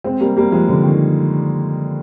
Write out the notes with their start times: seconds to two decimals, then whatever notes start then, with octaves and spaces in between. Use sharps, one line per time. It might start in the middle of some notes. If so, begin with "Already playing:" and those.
0.04 G#3 C4
0.21 G3 A#3
0.37 G3 A#3
0.52 F3 G#3
0.68 D3 F3
0.83 D#3